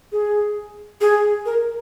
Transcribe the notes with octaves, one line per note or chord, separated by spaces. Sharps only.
G#4
G#4
A#4